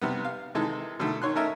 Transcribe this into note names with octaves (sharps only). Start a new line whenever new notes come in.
C3 G3 B3
F5
C3 D#3 E3 G#3 A4
B2 D3 D#3 A3
D#3 C#5 C6 F#6
A3 C#4 D#4 A#4 E5